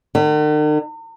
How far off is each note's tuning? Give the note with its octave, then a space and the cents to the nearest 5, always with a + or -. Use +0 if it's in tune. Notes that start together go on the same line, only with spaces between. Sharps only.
D#3 -45